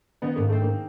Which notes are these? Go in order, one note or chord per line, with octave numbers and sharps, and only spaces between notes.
D#3 B3
G#2 A#3
A3 C4
A#3